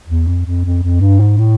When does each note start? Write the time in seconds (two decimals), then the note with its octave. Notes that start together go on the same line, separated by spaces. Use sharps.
0.08 E2
0.27 F2
0.46 F2
0.64 F2
0.83 F2
1.01 G2
1.20 G#2
1.38 A2